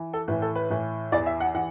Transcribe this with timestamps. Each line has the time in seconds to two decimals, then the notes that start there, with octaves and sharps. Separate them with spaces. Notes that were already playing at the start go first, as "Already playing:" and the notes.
Already playing: E3
0.13 A4
0.28 A2 B4
0.31 E3
0.42 A4
0.55 B4
0.70 A2 E3
1.12 E2 E3 D5
1.26 E5
1.40 F#5
1.55 E3 F#5